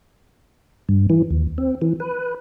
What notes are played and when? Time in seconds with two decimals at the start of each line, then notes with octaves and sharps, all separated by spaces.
0.89 G2
1.10 E3
1.30 D#2
1.58 C4
1.82 E3
2.00 B4